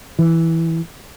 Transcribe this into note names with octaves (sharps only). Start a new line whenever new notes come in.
E3